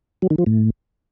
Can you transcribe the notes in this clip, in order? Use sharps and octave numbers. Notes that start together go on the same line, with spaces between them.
F#3
D#3
F3
A2